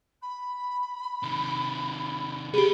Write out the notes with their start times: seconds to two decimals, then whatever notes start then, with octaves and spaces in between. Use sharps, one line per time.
0.21 B5
1.23 C3 D#3
2.54 G3 B3 G4 G#4 B5